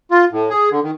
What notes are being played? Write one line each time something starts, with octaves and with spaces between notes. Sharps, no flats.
F4
A2
G#4
D3
D#3